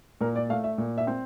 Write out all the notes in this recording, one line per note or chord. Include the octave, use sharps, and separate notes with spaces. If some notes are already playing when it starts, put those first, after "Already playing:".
A#2 A#4
D5
A3 F5
E5
A#2
E5
C4